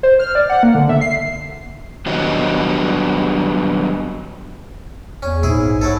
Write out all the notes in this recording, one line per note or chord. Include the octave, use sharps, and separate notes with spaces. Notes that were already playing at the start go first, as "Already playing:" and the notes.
C5
F6
D5
F#5
A#3
D3
E5
C7
D#3 F#3 G3 B3 D4 D#5
E2 C#4
A#1 G#2 E4 G#4
F#3 E4 A4